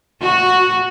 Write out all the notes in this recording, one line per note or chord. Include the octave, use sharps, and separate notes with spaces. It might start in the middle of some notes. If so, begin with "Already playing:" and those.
F#4